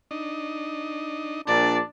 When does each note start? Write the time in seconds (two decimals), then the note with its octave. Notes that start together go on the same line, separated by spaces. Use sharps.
0.11 D4 D#4 D#5
1.47 A#1 A#2 D4 D5